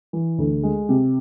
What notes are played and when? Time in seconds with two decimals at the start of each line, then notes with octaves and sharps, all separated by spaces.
0.13 E3
0.38 D2
0.63 G#3
0.89 C3